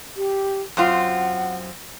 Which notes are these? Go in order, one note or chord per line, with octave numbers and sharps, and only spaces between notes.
G4
F#2 C4 F4 F#5